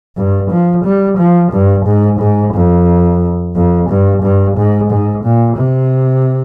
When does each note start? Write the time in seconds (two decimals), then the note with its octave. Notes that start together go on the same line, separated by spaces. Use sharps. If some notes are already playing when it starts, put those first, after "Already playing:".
0.17 G2
0.51 F3
0.84 G3
1.18 F3
1.52 G2
1.86 G#2
2.20 G#2
2.54 F2
3.55 F2
3.90 G2
4.23 G2
4.57 G#2
4.91 G#2
5.25 A#2
5.58 C3